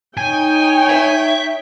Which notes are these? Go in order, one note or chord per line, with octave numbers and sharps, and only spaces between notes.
D#4 C#5 G5 G#5
E5